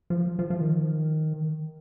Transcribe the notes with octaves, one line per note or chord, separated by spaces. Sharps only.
F3
F3
F3
D#3